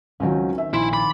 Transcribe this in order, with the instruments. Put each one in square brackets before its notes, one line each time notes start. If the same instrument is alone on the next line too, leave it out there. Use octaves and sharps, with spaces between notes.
[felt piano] C#2 F#3 [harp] D#3 C4 C#4
[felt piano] E5
[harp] A#1 [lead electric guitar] E4 [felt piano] C6
[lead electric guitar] B5 [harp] D6 A6